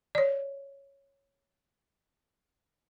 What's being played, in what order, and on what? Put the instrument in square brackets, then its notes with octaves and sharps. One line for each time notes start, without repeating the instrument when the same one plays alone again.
[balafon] C#5 D5